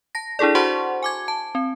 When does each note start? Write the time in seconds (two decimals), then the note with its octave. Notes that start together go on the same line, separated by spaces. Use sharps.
0.15 A5 A#6
0.39 D4 E4 G#4 A4 D5
0.55 F#4 C5 F#5 A5 C6 C#6
1.03 G#5 D6 G#6
1.28 A5
1.55 C4